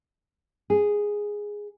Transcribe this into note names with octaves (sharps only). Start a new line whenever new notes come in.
G#4